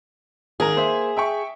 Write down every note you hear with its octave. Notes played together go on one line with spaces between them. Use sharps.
G#1 G#4 A#4 A#5
A#3 C5 E5
E5 G5 C#6